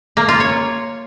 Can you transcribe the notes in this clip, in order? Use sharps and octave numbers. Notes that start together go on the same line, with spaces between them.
A#3
F4
C#5